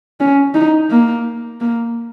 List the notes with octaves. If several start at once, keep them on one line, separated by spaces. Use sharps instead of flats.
C#4
D#4
A#3
A#3